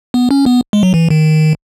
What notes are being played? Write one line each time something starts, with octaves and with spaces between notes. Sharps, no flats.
B3
C#4
B3
G#3
F#3
E3
D#3